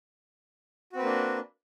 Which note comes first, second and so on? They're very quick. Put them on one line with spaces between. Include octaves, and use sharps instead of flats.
F#4 C4 B4 A#3 D4